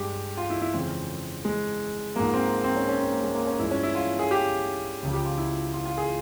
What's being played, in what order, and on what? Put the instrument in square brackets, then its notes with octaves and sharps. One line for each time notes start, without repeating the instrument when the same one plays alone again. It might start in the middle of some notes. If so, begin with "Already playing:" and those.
Already playing: [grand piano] G2 G#3 G4
F4
E4
E4
F2 C#3 E3 G#3 C4
G#3
G#2 F3 G#3 A#3
C4
C4
C#4
C#4
C4
A#3
G#3
A#3
C#4
G2 F3 G#3 E4
C#4
E4
F4
G#4
G4
C#2 C#3 F3
G4
F4
E4
F4
F4
G#4